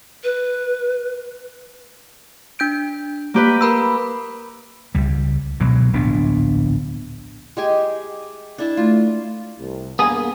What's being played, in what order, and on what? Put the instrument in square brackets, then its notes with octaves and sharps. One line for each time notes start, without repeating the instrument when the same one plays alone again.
[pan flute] B4
[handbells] D4 G6 D7
[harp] A#3 G4 B4
[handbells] A#4 B5 E6
[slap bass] C#2 G3
B2 F#3 G#3
D1 A#1 B3 D4
[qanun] G#3 G4 G#5 [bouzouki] D#4 D#5
[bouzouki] A3
[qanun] D4 E4 A5
[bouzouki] F#3 [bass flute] A3 [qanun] F4
[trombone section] C2
[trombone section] G2 A#3 [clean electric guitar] B3 G#4 [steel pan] G#5 D#6